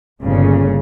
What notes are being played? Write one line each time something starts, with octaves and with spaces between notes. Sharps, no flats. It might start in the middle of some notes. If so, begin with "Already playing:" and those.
G1 A#2 C#3